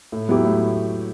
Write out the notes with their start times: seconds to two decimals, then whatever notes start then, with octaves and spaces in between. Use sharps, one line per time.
0.12 A2
0.29 F#3 B3 E4 G4
0.44 A2